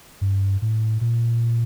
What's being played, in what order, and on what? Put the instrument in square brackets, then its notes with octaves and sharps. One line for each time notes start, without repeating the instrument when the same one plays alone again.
[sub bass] G2
A2
A#2